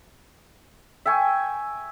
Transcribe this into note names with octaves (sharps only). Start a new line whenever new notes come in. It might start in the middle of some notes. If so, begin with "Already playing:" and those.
E5 G5 G#5 C#6